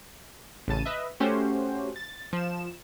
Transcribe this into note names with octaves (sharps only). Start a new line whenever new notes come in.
A1 C#3 A5 D#7
B4 D#5 E5
A3 C#4 F#4 G4 C5
A6
F3 E7